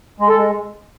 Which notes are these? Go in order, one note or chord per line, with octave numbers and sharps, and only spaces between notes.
G#3
A4
G#3